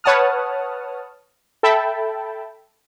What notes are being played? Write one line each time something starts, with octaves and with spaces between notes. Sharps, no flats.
B4 C#5 F#5 A5 D#6 F6
A4 E5 G5 A5 B5